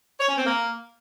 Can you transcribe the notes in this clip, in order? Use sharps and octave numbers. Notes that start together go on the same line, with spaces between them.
C#5
C#4
C4
A#3